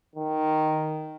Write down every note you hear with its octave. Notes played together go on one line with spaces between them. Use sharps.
D#3